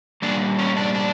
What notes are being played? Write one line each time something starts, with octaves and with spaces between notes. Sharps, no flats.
A#2 G3 A#3 D4
C#4
D4
D4